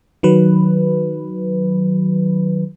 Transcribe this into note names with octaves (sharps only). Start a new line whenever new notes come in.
D#3 F#3 B4